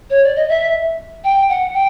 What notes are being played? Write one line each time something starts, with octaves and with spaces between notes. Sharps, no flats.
C#5
D5
D#5
E5
G5
F#5
G5